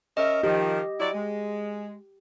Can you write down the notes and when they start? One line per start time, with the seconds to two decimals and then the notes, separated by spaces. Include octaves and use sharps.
0.17 C#4 A#4 D#5 E5
0.43 D#3 F3 G4
1.00 F#3 E4 D5
1.14 G#3